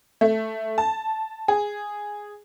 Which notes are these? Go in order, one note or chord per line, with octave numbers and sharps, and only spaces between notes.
A3
A5
G#4